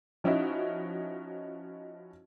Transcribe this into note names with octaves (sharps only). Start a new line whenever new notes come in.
F3 C#4 D#4 E4 F#4